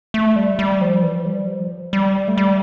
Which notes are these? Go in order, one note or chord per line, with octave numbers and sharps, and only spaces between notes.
A3
G3
G3
F3
E3
F3
G3
F3
G3
A3
G3